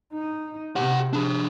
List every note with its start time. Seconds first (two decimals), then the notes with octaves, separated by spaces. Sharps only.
0.13 D#4
0.76 C3 G4 F#5
1.13 D4 G#4